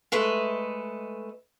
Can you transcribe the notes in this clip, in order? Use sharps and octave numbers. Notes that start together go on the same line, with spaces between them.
G#3 A3 B4 D#5